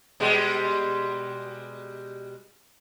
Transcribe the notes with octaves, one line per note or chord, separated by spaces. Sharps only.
B2 G3 G#3